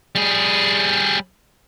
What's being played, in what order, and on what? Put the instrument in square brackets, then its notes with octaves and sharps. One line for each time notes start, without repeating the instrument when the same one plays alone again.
[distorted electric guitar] G3 G#4